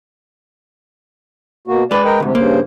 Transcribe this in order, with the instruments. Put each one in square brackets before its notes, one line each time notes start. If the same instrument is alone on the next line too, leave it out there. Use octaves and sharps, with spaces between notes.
[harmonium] B2 A#3 F#4
[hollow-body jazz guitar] G#3 B4 [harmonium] D5
[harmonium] A#4 D#5 G5
[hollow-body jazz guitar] D2 G#2 [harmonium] C3
[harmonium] G2 C#3 C5 [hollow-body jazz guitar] A#3